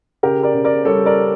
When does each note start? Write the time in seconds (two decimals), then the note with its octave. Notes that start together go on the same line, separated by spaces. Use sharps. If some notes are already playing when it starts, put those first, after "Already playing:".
0.23 C#3 G4 A#4
0.43 A#4 D5
0.54 C#3
0.64 A#4 D5
0.85 G3 A4 C#5
1.06 A#4 D5